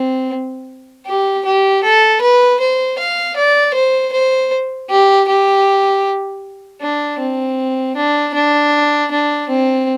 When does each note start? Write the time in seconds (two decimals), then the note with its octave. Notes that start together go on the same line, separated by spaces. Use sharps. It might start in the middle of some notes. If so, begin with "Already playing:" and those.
Already playing: C4
1.06 G4
1.44 G4
1.83 A4
2.21 B4
2.59 C5
2.98 F5
3.36 D5
3.74 C5
4.13 C5
4.89 G4
5.28 G4
6.81 D4
7.19 C4
7.96 D4
8.34 D4
9.11 D4
9.49 C4